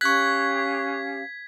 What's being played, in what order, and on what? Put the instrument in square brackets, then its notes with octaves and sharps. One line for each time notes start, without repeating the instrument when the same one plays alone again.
[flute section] C#4 G4 F5 [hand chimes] C#6 F#6 [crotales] G#6 B6